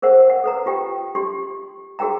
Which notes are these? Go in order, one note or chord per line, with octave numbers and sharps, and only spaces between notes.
G#4 A#4 C5 F#5
F#5
A4 B4 A#5
F4 G4 G5
G4 C6
F#4 G#4 A#4 G5 A#5